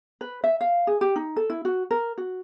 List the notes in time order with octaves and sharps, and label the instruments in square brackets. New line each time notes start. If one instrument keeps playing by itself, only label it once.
[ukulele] B4
E5
F5
G#4
G4
D#4
A4
E4
F#4
A#4
F#4